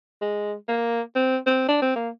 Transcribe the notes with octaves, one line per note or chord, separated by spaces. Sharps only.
G#3
A#3
C4
C4
D4
C4
A#3